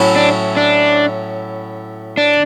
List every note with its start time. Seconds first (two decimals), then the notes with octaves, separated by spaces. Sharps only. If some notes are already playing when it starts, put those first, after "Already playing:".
Already playing: A2 F#3 C#4 E4
0.16 D4
0.57 D4
2.17 D4